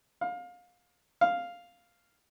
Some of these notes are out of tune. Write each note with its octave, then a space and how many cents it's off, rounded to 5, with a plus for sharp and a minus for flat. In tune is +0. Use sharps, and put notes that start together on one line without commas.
F5 +25
F5 +0